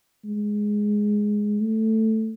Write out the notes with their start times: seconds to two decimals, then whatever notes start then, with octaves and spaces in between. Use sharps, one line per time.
0.24 G#3
1.61 A3